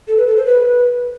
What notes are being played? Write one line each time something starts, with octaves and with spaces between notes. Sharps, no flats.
A4
B4
A4
C5
B4